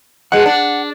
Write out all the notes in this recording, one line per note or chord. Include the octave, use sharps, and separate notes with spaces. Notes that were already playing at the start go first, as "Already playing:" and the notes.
B2 G#3 F#5
D4